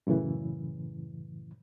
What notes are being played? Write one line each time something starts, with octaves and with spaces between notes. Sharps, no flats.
F#2 A2 C#3 E3